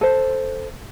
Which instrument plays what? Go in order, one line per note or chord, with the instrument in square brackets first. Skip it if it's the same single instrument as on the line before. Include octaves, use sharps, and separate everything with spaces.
[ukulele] A4 C5